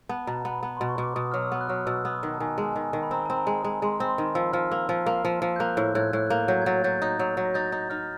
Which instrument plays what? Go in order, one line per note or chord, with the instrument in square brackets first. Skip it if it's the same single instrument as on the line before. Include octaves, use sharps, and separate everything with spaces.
[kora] B3 [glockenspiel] A5
[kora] B2 [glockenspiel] A#5
[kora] B3 [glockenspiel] B5
[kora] B3
[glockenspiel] C6
[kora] B2
[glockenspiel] C#6
[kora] B2
[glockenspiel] D6
[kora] B2 [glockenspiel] D#6
[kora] F#3 [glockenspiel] F6
[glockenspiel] E6
[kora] B3
[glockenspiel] F#6
[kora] F#3 [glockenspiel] F6
[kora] B2 [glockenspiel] E6
[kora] B3 [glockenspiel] D#6
[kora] D#3 [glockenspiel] A#5
[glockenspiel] A5
[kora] D#3 [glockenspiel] G#5
[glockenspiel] A#5
[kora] G#3 [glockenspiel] A5
[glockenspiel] G#5
[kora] D#3 [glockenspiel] A5
[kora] D#3
[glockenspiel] B5
[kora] C4 [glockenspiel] A#5
[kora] C4 [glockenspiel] A5
[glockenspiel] A#5
[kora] G#3
G#3
[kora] G#3 [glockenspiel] C6
[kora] C4 [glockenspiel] B5
[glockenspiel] C6
[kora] D#3
[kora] F3 [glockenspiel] E6
[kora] F3 [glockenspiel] F6
[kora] A#3 [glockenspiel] E6
[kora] F3
A#3
F3
[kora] F3 [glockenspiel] E6
[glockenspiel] G6
[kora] A#3 [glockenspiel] F#6
[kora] A2 [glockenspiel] G6
[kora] A2 [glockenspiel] F#6 G#6
[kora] A2 [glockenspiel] F#6
[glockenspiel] F#6
[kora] A#3 [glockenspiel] G6
[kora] F#3 [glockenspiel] G6
[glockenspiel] G#6
[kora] F#3 [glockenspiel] G6 A6
[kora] F#3 [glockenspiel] G6 A6
[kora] D#4
F#3
F#3
[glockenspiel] A#6
[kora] D#4 [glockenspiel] G6 A6
[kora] D#4
[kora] D#4 [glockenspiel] F6